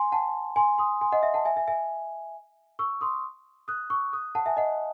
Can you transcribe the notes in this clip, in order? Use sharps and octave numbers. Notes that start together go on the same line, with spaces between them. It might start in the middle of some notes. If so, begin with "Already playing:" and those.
Already playing: G#5 C6
F#5 A5
G#5 C6
C6 D#6
G#5 C6
D#5 F#5
E5
F#5 A5
E5 G#5
E5 G#5
E5 G#5
C#6 E6
C6 D#6
D#6 F#6
C#6 E6
D#6 F#6
F#5 A5
E5 G#5
D#5 F#5